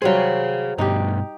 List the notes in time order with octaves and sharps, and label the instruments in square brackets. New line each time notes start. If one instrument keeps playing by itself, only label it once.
[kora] F#3 G3 C5 [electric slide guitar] G#4 F5
[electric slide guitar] G2 B2 [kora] D#4 G4